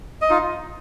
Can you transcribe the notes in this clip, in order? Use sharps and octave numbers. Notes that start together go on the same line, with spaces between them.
D#5
D#4 F4